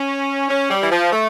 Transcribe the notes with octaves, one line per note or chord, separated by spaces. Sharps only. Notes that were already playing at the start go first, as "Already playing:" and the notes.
Already playing: C#4
C#4
G3
E3
F3
A3